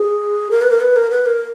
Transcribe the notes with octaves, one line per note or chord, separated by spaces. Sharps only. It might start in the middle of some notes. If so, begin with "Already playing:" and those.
Already playing: G#4
A#4
B4
A#4
B4
A#4
B4
A#4